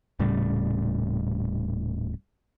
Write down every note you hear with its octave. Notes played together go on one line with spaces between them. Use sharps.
D#1 A2 C#3 G3